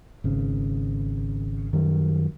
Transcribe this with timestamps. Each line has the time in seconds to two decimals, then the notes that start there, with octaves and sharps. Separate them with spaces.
0.24 G#1 C#3
1.73 F#2 D#3 G3